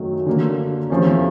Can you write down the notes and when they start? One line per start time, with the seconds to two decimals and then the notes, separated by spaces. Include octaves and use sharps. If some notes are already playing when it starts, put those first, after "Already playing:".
Already playing: F#2 D#3 F#3 A3
0.26 D3 F#3 A#3
0.90 E2 C3 F3 A3 C#4